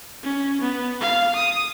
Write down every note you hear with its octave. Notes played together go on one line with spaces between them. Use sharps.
C#4
B3
F5
D#6